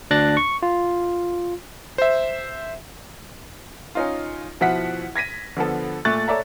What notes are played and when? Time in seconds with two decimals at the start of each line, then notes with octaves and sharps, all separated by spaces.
0.11 D2 D4 F#6 A6 A#6
0.37 C#6
0.63 F4
1.98 C5 E5
3.95 C#4 D#4 F4
4.61 B2 F3 E4 F#4 F#5 B6
5.16 G#6 A#6 B6 D#7
5.56 D3 F3 B3 A4
6.05 A#2 A3 C#6 F#6 A6
6.28 A4 C#5 D5 E5 A#5